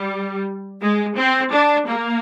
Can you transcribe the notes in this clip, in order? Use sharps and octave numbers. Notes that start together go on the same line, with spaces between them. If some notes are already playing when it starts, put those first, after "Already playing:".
Already playing: G3
G#3
C4
D4
A#3